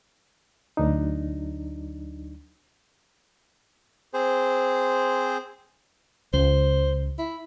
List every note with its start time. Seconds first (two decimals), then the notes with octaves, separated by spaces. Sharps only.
0.77 D2 F#3 D4 D#4
4.14 C4 G#4 C5
6.33 C#2 C5
7.19 E4